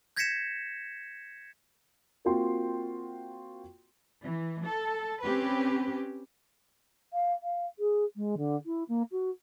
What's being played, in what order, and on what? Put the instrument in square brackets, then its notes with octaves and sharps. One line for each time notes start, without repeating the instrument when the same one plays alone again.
[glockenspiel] G6 G#6 A#6 B6 C#7 E7
[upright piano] A#3 C4 F4 F#4 G5 C6
[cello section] E3
A4
C4 C#4 G4 B4
[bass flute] F5
F5
G#4
G#3
D3
E4
A#3
F#4